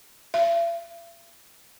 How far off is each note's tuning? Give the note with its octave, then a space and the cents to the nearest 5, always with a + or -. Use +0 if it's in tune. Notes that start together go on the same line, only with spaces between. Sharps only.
E5 +45